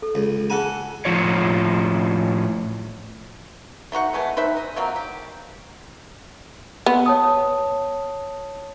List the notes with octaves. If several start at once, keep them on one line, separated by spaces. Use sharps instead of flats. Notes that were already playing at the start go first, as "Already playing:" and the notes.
A4
C#2
F4 G#4 A4 F#5 G#5
A2 F3 F4 C#5
A3 D#4 F#4 F#5
E3 G#3 A3 B3
D#4 B4 C5 E5
D#5
F3 F#3 A#3 C4
G4
B3
C#5 A5 D#6